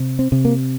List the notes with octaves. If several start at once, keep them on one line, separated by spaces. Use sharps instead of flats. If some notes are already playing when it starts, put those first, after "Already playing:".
Already playing: C3
C4
C3
A#3